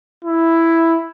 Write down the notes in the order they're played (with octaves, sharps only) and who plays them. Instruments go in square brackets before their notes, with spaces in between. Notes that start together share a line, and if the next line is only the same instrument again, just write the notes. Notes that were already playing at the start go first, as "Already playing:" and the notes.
[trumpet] E4